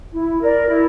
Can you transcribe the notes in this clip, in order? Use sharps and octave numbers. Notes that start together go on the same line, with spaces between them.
E4
A#4 D5
E4